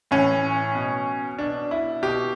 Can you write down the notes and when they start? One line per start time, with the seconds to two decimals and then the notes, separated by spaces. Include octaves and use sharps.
0.11 A2 E3 C#4
0.75 B2
1.39 B2 D4
1.71 E4
2.02 B2 G4